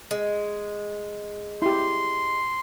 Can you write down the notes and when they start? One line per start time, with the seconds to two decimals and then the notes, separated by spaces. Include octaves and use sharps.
0.11 G#3
1.62 E4 G4 C6